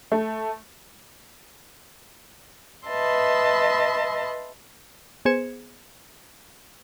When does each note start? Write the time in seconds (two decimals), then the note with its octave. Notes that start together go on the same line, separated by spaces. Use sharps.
0.12 A3
2.87 B4 D#5 E5 A5 C6
5.25 B3 G#4 C5 G#6 C#7 E7